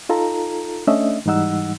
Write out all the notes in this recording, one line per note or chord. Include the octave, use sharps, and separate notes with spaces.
D#4 F4 A4 A#5
A3 C#4 D4 D#5 E5
G#2 E3 G3 D#4 F#5 E6